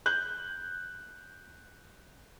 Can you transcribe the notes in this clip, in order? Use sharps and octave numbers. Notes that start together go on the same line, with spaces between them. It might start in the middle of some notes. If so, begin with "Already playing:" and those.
F#6 G6